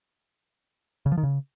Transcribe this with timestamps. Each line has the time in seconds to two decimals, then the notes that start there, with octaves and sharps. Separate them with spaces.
1.06 C#3
1.12 F3
1.18 D#3
1.23 C#3